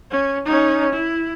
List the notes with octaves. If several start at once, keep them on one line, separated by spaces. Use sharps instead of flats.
C#4
C#4 D#4
E4